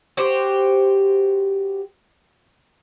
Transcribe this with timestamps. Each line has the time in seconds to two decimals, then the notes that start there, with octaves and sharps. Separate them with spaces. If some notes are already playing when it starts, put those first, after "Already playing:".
0.17 F#4 G4 C5